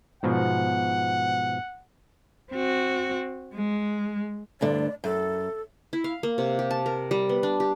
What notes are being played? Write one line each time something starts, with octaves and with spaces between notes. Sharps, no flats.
G#2 B2 F3 F#5
C4 F#4
G#3
D2 G2 D3 D5
F#2 A4
E4
F5
A#3
C3
G4
A5
A#4
G3
B3
D4
G4